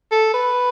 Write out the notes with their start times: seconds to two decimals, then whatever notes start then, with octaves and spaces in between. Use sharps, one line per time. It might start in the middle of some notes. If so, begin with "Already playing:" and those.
0.11 A4
0.34 B4